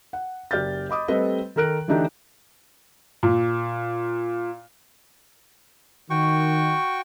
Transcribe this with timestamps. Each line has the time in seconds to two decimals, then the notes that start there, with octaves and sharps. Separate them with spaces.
0.13 F#5
0.51 F#1 G4 D5 F6 G6 A6
0.89 D#5 B5 D6 D#6
1.08 G3 A3 C4 A4 B4 D#5
1.56 D#3 A4 A#4 F#6 D7
1.88 D3 E3 A3 D4 D#4 G4
3.23 A#2
6.10 D#3 F#4 G5 C#6